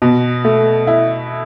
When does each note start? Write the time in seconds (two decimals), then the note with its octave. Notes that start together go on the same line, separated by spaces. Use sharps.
0.02 B2
0.45 A3
0.87 E4